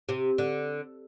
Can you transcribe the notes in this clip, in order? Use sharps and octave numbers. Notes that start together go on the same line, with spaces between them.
C3
D3